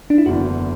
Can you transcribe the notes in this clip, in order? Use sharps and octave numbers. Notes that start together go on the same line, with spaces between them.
D4
E4
F#1 E2 D3 F#4